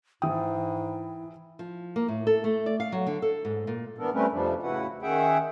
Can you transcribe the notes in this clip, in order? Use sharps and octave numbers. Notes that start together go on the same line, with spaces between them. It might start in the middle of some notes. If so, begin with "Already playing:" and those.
G#2 E3 E4 G5 D#6
F3
A#3
A2
A4
A3
D5
F5
F#3
D3
A4
G#2
A#2
E3 B3 D4 A4 A#4
G3 A3 C4 C#4 A#4 B4
F2 C3 F3 G3 D4
A2 C#3 E4 F#4 B4 F#5
D#3 C#4 G#4 E5 F#5 G5